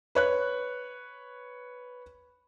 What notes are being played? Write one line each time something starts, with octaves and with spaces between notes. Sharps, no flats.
B4 C#5 F#6